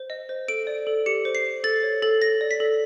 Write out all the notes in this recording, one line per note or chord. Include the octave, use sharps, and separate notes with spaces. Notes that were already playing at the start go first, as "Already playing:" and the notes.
Already playing: C5
D#5
C5
A4 D7
D5
A4
G4 C#7
C5
C7
G4
A4 A6
C#5
A4 A6
A4 A#6
D5
B6
A4